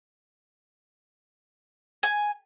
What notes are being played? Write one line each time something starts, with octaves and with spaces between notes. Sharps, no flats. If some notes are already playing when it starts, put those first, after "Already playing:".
G#5